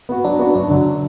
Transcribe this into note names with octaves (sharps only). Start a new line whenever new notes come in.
B3 F#4
F#3 D4
B3 D4 F#4
F#2 D4
D3 F#3